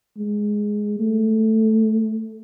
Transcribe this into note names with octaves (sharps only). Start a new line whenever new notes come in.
G#3
A3